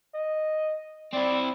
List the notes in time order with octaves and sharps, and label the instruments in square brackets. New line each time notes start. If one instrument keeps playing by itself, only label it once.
[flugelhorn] D#5
[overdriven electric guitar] C4 E4 [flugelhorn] D5